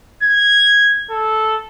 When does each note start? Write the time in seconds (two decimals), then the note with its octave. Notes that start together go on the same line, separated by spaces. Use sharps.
0.23 G#6
1.10 A4